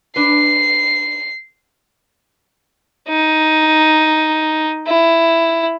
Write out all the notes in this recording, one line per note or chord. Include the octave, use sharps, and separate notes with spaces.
D4 B4 C7
D#4
E4